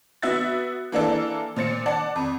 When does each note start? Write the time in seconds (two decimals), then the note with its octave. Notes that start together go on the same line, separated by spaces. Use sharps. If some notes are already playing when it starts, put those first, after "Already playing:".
0.22 B3 F#4 E5 F#6 A6
0.92 E3 A#3 D4 A4
1.56 A#2 C5 A6 C#7
1.86 D5 F#5 A5
2.16 F2